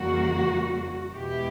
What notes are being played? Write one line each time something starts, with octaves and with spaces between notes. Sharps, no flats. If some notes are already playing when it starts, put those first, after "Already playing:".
Already playing: F2 C#3 E3 G3 A#3 F#4
E2 B2 G#3 B3 E4 G4